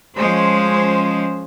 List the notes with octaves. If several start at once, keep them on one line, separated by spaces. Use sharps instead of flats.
F3 G#3 C#4 C5